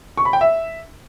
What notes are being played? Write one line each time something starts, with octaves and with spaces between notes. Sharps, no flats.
C#6
B5
G5
E5